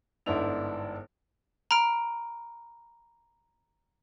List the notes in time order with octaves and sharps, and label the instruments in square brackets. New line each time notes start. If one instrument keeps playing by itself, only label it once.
[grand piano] G1 G#2 B3 D4 E4 F7
[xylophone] A#5 B5 F6 D7